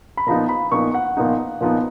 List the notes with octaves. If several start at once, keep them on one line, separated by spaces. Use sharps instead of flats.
B5
A#2 F3 B3 D#4 A#5
B5
A#2 F3 B3 D#4 C#6
F#5
A#2 F3 B3 D#4
A#2 F3 B3 D#4